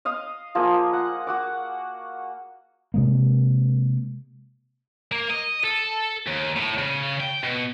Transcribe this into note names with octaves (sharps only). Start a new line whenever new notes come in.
D#5 F5 D#6
F3 A#3 G#4 G#5
F#5
F#4 F#5 D6
C3 G#3 A#3
A#3
D#5
A4
D#2
A2
C#3
G5
B2